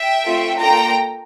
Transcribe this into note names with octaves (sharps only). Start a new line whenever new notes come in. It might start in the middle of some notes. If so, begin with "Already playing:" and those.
Already playing: E5 G5
A3 C4 F4 A4
A#3 D4 F4 A4 G5 A#5